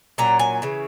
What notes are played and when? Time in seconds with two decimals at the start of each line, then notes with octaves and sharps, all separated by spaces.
0.18 A#2 F#3 C#4 A#5
0.39 G#5
0.62 C#3 E3